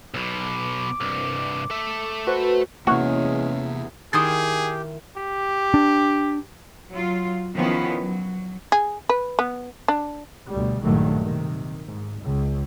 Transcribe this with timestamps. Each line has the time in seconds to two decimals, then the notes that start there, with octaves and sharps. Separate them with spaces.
0.14 B1 B2 D6
1.01 C2 G2
1.70 A3 E5
2.27 F#4 B4 C5
2.87 E2 C3 E3 G#3 A#3 C#4 F#4
4.13 D#3 E4 G4 G#4 C6 D#6 G#6 A6
5.17 G4
5.74 D4
6.91 F#3 F4
7.54 D#3 F3 B3 C#4 E4 F4
7.99 F#3
8.72 G#4
9.09 B4
9.39 B3
9.88 D4
10.49 D2 B2 G3
10.81 A#1 G2 D#3 F#3 G3 A3
11.24 C3 D#3
11.84 G#2
12.19 C#2